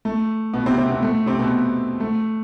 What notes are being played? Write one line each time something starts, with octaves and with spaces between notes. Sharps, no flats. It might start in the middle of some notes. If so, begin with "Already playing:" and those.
A3
B2 B3
C3 C4
C3 C4
B2 B3
A3
C3 C4
B2 B3
A3